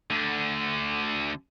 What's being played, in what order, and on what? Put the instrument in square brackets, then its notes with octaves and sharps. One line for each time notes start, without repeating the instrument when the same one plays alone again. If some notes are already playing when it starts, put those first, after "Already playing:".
[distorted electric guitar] D2 D3